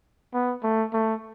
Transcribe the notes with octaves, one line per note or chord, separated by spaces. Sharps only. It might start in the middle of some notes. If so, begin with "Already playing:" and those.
B3
A3
A3